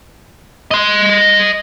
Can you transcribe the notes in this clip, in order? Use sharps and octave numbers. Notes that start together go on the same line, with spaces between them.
D#5 C6